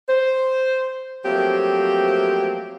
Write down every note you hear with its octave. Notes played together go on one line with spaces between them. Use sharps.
C5
F3 F#3 A3 A#3 C4 G4